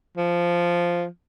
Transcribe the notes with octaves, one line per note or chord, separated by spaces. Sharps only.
F3